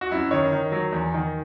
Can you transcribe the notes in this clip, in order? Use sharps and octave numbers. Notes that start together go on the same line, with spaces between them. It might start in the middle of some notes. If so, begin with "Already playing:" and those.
F#4
F#2 E4
D#3 C#5
D#3
F#3
E2
D#3